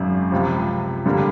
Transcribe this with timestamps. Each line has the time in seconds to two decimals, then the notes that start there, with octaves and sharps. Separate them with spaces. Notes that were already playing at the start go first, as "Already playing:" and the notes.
Already playing: G#1 F#2 C#3
0.32 C#2 C3 F3
1.06 G2 D3 G3 A#3